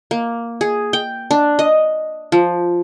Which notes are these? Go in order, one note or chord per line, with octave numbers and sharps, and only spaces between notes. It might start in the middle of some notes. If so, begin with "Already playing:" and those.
A#3
G#4
G5
D4
D#5
F3